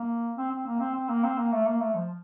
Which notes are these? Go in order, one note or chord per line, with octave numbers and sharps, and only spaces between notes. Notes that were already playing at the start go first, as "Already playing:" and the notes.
Already playing: A#3
C4
C4
A#3
C4
C4
A#3
C4
A#3
A3
A#3
A3
F3